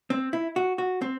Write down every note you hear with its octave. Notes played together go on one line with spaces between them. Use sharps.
C4
E4
F#4
F#4
C4